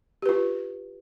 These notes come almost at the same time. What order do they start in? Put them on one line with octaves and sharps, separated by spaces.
G4 B4 F4